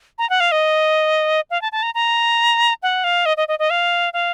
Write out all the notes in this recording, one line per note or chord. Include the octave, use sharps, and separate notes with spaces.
A#5
F#5
F5
D#5
F5
A5
A5
A#5
A#5
F#5
F5
D#5
D#5
D#5
D#5
F5
F5